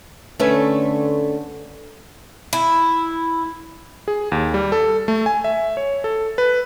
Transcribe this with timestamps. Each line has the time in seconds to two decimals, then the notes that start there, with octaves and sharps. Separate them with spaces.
0.40 D3 A3 C#4 B4
2.53 E4
4.08 G#4
4.32 D#2
4.54 G3
4.72 A4
5.08 A3
5.26 G#5
5.44 E5
5.77 C#5
6.04 A4
6.38 B4